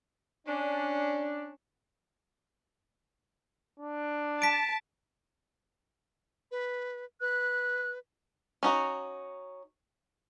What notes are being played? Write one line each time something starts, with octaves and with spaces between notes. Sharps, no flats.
C#4 D4
D4
A5 B6 D7
B4
B4 F#6
C#4 D#4 F#4